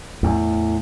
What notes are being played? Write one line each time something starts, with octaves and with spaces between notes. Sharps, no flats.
E2 A2